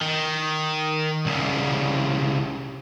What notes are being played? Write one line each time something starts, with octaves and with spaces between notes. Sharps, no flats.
D#3
C2 C#3